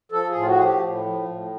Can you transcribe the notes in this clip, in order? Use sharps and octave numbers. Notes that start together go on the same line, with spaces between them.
F3 A4
G#4
A2
F4
F#4
F3 G#4
G4
A2
F3
A2